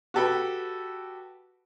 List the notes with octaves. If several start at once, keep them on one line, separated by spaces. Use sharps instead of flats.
F#4 G4 A4 B4 G5 B5